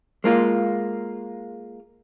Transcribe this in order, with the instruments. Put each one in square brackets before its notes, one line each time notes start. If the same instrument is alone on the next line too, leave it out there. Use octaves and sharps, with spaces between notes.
[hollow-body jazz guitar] G#3 A#3 F4